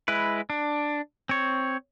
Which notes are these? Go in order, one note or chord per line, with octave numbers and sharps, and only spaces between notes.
G#3 E4 B4
D4
C4 C#5